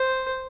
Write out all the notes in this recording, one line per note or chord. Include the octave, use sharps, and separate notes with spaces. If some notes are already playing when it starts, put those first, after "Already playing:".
Already playing: C5